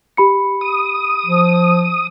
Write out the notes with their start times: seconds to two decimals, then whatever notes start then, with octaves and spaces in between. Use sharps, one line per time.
0.17 G4 B5 C#7
0.61 D#6
1.26 F3